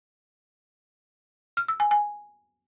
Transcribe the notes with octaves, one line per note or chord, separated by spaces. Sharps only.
F6
E6
G#5
G#5